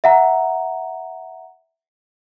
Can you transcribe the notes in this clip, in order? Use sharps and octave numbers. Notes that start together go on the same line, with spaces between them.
E5 F#5 A#5